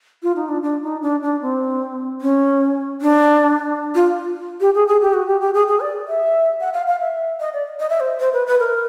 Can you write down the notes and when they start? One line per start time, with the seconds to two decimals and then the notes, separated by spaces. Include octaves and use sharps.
0.23 F4
0.36 D#4
0.48 D4
0.63 D4
0.83 D#4
1.02 D4
1.22 D4
1.42 C4
2.21 C#4
3.02 D4
3.95 F4
4.61 G4
4.75 G#4
4.88 G#4
5.01 G4
5.14 F#4
5.28 G4
5.41 G4
5.54 G#4
5.68 G#4
5.80 D5
6.08 E5
6.60 F#5
6.73 F5
6.87 F5
7.01 E5
7.40 D#5
7.53 D5
7.80 D#5
7.90 E5
8.00 C5
8.20 C5
8.33 B4
8.47 B4
8.60 A#4